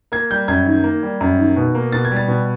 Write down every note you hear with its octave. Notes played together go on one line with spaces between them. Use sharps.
A#3 G#6
G3 G6
F#2 G#6
D#3
A#3
G3
F#2
D#3
B2
A#3
B2 A6
G#6
G3
A6
B2